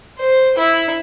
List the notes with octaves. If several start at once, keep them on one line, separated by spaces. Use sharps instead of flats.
C5
E4